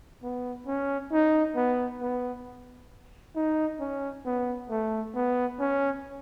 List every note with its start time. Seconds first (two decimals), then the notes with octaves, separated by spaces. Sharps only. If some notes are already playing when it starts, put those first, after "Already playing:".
0.23 B3
0.67 C#4
1.12 D#4
1.56 B3
2.01 B3
3.36 D#4
3.80 C#4
4.26 B3
4.70 A3
5.15 B3
5.60 C#4